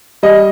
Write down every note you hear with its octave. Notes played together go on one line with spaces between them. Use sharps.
G3 D#5